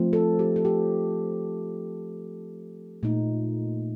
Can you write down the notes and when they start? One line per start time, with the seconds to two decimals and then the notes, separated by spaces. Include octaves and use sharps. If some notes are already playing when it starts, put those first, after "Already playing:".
Already playing: F3 A3 C4
0.13 A4
0.39 G4
0.56 A4
0.65 G4
3.03 A#2 A3 D#4